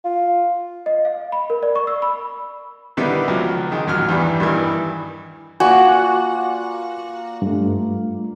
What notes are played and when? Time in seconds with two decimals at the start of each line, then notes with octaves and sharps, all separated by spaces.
0.05 F4
0.86 D#5
1.05 F5
1.32 B5
1.50 A#4
1.63 D5
1.75 C#6
1.87 E6
2.02 B5
2.97 D3 D#3 G3 B3 D#4 E4
3.28 C#2 F3 F#3
3.71 D#3 G#3
3.87 A1 D#2 F#3 F6
4.09 E2 G2 G3
4.40 G2 D#3 E3
5.60 A#3 F4 F#4 D5 G#5
7.42 G2 A3